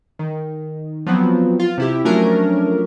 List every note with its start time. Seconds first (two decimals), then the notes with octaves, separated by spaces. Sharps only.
0.19 D#3
1.06 F3 F#3 B3 C4
1.60 F4
1.78 C3 E4 G4
2.05 F3 F#3 A3 C#4 D4 A#4